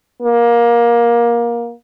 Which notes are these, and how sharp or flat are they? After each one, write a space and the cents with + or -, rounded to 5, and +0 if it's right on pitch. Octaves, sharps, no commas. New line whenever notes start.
A#3 +20